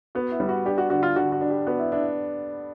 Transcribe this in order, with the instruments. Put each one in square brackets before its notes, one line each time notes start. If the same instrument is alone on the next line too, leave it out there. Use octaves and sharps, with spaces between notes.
[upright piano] B3 [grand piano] F#4
[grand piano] E4
[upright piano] G3
[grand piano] F#4
[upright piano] D4 [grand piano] G4
[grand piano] F#4
[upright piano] D3 [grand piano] F#4
[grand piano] F4
[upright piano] D3 [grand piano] F#4
[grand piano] F#4
[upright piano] D4
[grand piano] G4
[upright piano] B3 [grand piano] F#4
[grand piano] E4
[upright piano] D4 [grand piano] E4